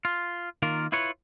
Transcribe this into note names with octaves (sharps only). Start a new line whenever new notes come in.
F4
D#3 A#3 F4 A#4
E4 F4 B4 C#5